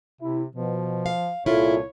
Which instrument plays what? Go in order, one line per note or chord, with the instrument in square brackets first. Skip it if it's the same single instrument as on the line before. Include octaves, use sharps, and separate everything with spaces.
[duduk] C3 [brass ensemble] E4
[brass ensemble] B2 [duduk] F3
[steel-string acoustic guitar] F5
[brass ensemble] C2 A#2 A4 [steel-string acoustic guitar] E4 F4 [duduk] C#5